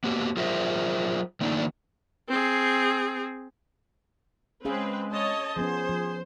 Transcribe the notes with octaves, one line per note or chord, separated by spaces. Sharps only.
A#3 B3 F#4 G4
F#3 F4 G#4 A#4 C5 E5
D#3 A3 A#3 D4 D#4
C4 G#4
G#3 C4 C#4 G#4 B4 F5
C#5 D#5 A5
F3 B3 C#4 G#4 C5
F3